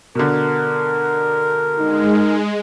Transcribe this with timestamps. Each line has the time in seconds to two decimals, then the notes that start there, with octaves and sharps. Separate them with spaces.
0.15 B2 D3 A#4
1.79 G#3 D#4